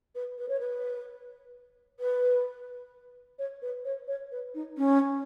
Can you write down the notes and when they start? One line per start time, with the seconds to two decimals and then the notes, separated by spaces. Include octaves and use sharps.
0.15 B4
0.38 B4
0.49 C#5
0.60 B4
2.00 B4
3.39 C#5
3.62 B4
3.85 C#5
4.08 C#5
4.32 B4
4.54 D#4
4.77 C#4